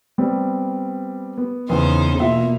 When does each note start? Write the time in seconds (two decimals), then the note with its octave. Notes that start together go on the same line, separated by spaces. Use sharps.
0.18 G3 B3 C4
1.38 B3
1.69 E2 C#3 B3 D#4 C5
2.19 E2 B2 A#3 F4 E5 C6